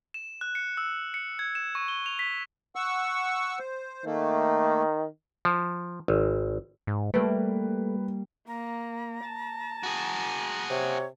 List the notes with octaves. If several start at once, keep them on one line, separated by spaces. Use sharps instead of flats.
E7
F#6
C#7
E6
C#7
G#6
E7
C#6
G7
F7
B6
F#5 C#6 E6
C5
D#3 A3 A#3
F3
G#1
G#2
G3 A3 A#3 B4
A#3 A#5
A5
F#4 G#4
C3 C#5